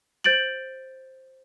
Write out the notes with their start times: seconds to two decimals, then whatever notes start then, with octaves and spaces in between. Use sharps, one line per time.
0.24 C5 G6 A6 D7 F#7